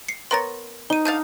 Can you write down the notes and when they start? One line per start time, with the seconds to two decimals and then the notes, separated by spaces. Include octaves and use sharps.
0.08 C7 C#7
0.31 B3 A#4 C#5 C6 A6
0.90 D#4 D#7 G7
1.05 D3 F5 A5 G6 A6